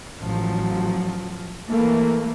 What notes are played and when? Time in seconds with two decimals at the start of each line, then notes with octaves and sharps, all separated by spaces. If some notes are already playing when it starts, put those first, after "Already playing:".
0.18 A1 F3 F#3
1.69 E3 A3 A#3